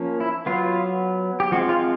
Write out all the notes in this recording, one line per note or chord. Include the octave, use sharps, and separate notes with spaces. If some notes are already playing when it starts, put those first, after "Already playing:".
Already playing: F3 A#3 C#4
E4
F#3 B3 F4
G4
F3 G#3 C4 F#4
F4